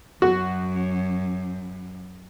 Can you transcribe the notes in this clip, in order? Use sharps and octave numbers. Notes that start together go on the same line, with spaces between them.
F#2 F#4